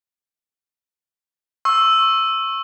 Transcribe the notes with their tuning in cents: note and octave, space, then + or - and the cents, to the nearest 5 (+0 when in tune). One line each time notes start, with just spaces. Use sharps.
C#6 -25 E6 +0